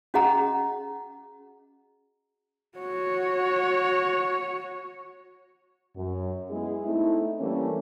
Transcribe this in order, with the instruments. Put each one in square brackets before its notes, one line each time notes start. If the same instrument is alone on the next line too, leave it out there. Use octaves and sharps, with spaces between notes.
[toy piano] C#4 F#4 G#4 D#5 F#5 A#5
[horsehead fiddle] F#4 C#5
[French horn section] F#2
G#3 B3 E4 G#4
A3 C4 D#4 E4
E3 G3 A3 A#3 C#4